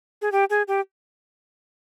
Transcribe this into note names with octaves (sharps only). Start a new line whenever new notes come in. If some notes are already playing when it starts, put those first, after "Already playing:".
G#4
G4
G#4
G4